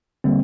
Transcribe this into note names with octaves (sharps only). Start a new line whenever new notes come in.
D3 G3 A#3 C4